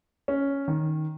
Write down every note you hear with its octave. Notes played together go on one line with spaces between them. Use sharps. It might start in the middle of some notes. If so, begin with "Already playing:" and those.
C#4
D#3